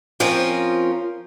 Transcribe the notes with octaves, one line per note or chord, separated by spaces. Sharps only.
F3 C4 C#4 F4 A#4